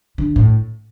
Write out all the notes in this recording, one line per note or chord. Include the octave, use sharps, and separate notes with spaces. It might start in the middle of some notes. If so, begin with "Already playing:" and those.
D3
A2